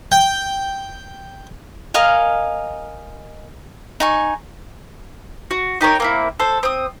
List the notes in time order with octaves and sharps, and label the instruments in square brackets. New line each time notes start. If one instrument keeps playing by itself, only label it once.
[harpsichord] G5
[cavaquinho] A#4 D#5 F5 G#5
D#4 G#5 C#6
[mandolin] F#4
D#4 G4 A#4 C#5
A#3 C4 E4
A4 C5
C4 D#6